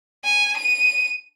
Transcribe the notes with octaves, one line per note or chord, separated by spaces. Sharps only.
G#5
D#7